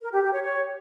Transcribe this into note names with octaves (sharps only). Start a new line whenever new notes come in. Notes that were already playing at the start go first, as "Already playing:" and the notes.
A#4
G4
G4
C#5
C#5